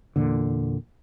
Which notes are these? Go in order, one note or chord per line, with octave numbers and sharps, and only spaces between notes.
E2 A#2 D3